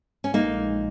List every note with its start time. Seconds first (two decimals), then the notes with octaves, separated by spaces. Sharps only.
0.24 C#4
0.34 A#1 A#2 G#3 A#3 D#4